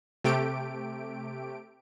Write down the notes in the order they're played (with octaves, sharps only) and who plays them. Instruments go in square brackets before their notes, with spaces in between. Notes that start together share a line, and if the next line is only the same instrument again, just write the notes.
[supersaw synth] C3 A3 G4 D7